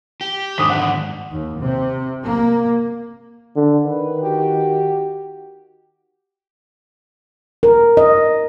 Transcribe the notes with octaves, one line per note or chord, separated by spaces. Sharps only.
G4
G#2 D3 D#3 D6 D#6 B6
F#5
D#2
C3
A#3
D3
D#3 B4
F#4 G4
A#4
D#5